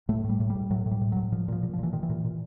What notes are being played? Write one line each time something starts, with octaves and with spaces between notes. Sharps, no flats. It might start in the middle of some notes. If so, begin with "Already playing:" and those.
A2 A3
A2 G3
A2
G3
A2
A2 F#3
A2
G3
A2
A2 F#3
A#2 F3
A#2 F3
A#2
F3
A#2 E3
A#2 D#3
E3
A#2
A#2